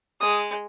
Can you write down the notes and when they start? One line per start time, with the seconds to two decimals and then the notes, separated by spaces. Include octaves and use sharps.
0.21 G#3 D#6